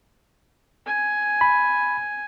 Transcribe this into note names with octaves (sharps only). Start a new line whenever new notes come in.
G#5
B5